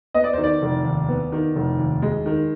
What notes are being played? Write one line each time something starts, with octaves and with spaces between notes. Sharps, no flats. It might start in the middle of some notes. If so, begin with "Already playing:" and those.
B3 D#5
D5
D#3 C5
D5
F1
D#2
B3
D#3
F1
D#2
G#3
D#3